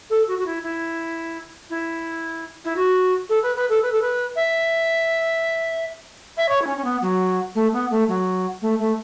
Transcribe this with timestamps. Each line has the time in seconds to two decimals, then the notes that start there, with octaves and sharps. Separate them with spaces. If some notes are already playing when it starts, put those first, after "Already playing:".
0.10 A4
0.27 F#4
0.38 F#4
0.46 E4
0.63 E4
1.69 E4
2.64 E4
2.76 F#4
3.29 A4
3.42 B4
3.56 B4
3.69 A4
3.82 B4
3.92 A4
4.01 B4
4.35 E5
6.37 E5
6.48 C#5
6.61 E4
6.66 C#4
6.77 C#4
6.84 B3
7.01 F#3
7.55 A3
7.72 B3
7.91 A3
8.08 F#3
8.61 A3
8.79 A3